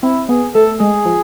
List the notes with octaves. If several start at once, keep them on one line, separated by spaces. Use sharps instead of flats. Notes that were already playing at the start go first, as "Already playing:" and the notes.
C4 E4
B3 G#4
A3 A4
G#3 G#4
F3